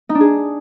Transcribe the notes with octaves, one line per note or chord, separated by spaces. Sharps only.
D#4
D4
G#4